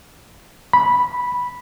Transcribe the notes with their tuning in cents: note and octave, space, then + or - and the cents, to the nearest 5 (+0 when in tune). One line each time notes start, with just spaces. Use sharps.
B5 -5